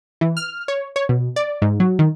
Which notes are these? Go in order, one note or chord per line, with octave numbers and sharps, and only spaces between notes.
E3
F6
C#5
C#5
B2
D5
G#2
F#3
D#3